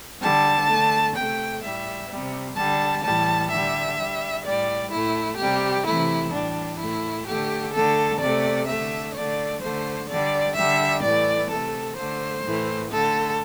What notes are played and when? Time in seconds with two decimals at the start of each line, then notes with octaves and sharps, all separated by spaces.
0.20 D3 G3 A5
0.68 D3 A3
1.15 C3 A3 G5
1.62 A2 G3 E5
2.08 C3 G3
2.55 D3 G3 A5
3.02 A2 E3 G3 A5
3.50 D3 G3 E5
3.97 D3 G3
4.44 A2 G3 D5
4.91 A2 A3 E4
5.37 C3 G3 G4
5.85 C3 E3 A3 E4
6.32 A2 E3 G3 D4
6.78 A2 A3 E4
7.25 D3 A3 G4
7.72 D3 A3 A4
8.20 C3 A3 D5
8.66 D3 A3 E5
9.13 D3 A3 D5
9.61 D3 A3 C5
10.08 D3 G3 D5
10.54 D3 G3 E5
11.02 A2 E3 A3 D5
11.49 C3 A3 A4
11.95 D3 A3 C5
12.43 A2 E3 A3
12.89 D3 A3 A4